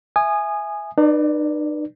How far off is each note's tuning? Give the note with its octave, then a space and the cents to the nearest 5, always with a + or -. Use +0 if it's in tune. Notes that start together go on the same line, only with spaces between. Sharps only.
E5 +0 G#5 +0 D#6 -25
D#4 -45 B4 -25 D5 +0